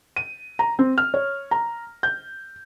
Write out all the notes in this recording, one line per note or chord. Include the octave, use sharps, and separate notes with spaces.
D#7
A#5
C4
F6
C#5
A#5
G6